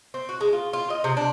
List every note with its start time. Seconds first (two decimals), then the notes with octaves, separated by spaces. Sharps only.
0.14 C4
0.29 F#4
0.41 G#3
0.53 F4
0.73 F4
0.90 D#5
1.04 C3
1.17 D4